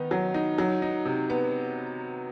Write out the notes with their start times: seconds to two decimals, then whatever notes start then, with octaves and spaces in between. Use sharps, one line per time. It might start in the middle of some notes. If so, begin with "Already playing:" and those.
Already playing: D#3 B3 D#4
0.11 F#3
0.34 D#4
0.58 F#3
0.82 D#4
1.05 C3
1.30 B3